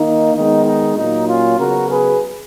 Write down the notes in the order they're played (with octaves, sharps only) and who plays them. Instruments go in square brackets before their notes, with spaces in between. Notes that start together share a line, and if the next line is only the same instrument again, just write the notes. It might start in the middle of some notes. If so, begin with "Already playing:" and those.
Already playing: [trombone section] D#3 A#3 D#4
D#3 G#3 B3 D#4
D#4
A#2 F#3 A#3 D#4
C#4 F4
C#3 F#3 B3 F#4 A#4
G#4 B4